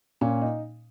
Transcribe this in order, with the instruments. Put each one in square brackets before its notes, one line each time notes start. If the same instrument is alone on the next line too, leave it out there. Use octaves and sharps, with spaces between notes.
[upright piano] A#2 [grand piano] C#4
[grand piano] D#4